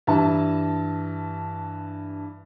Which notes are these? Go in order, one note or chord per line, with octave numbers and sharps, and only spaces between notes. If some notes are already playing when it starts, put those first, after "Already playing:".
G2 E3 E5 A5